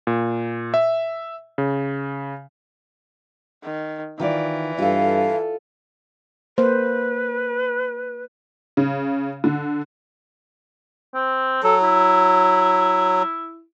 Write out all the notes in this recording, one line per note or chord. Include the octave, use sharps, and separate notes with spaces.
A#2
E5
C#3
D#3
D#3 E3 F4 D5
G2 F4 A4 F5
A#3 B4 C5
C#3
D3
C4
F#3 A4
E4